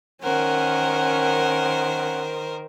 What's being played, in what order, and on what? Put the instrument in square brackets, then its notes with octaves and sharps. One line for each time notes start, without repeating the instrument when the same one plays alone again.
[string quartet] D#3 A#4 C5 [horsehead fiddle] C#4 F#5